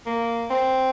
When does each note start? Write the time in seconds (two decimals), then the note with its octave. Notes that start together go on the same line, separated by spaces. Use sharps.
0.06 A#3
0.50 C4